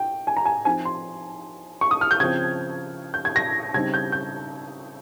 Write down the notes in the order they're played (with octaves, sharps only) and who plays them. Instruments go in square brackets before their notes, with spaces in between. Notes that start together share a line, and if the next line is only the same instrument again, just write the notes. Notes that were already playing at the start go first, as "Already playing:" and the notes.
Already playing: [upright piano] G5
G#5
A#5
G#5
F3 C4 D#4 G#5
C6
C#6
D#6
F6
G6
C#3 F3 C4 G#6
G6
G#6
A#6
C#3 G3 C4 D#4 G#6
G6
G6